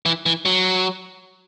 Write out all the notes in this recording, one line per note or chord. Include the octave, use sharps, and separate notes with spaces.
E3
E3
F#3